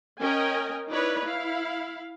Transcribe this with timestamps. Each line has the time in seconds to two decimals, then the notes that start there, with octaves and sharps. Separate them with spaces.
0.19 C#4 A#4 D#5 G5 G#5
0.89 D#4 E4 B4 C#5 D5
1.22 E4 F5